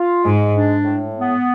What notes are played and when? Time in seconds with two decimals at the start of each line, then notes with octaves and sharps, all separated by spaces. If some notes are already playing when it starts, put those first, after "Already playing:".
Already playing: F4
0.24 G#2 G#3
0.54 D4
0.85 A2
1.16 B3